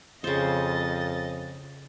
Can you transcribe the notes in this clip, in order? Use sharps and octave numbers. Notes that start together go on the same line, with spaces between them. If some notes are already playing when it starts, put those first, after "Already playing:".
F2 C#3 C5 D#5 A6